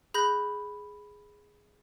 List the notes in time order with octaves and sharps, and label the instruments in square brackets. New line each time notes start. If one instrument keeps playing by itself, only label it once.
[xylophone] G#4 B5 F#6 G6 A#6 F#7